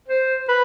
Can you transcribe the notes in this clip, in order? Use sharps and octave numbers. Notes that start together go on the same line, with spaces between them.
C5
B4